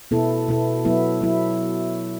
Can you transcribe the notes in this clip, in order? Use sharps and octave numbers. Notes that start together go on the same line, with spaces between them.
B2 B3 E4 A4
B2 B3 E4 A4
F#3 B3 E4
F#3 B3 E4